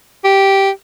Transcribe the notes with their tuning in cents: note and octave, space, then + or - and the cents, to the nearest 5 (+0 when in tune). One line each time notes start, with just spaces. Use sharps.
G4 -5